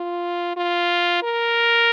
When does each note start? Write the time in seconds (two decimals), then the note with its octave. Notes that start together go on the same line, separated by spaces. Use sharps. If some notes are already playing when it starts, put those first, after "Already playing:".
Already playing: F4
0.57 F4
1.23 A#4